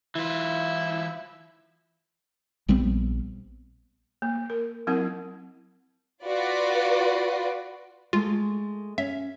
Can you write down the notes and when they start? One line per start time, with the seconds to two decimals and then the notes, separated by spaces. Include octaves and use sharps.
0.15 E3 E4 F4
2.68 A#1 G3 B3 C4
4.22 A#3
4.50 A#4
4.87 F#3 C4 E4 A#4 F#5
6.24 F4 F#4 B4 D5
8.13 G#3 A3 F4
8.98 C#4 E5